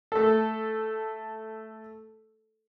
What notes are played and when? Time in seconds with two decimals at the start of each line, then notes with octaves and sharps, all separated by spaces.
0.12 A3 A4